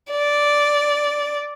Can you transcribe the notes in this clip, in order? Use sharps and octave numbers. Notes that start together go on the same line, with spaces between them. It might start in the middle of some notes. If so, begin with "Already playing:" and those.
D5